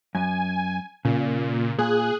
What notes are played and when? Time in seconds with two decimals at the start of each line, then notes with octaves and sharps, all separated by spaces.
0.15 F#2 G#5
1.05 A#2 C#3
1.79 A#2 G#4 F#6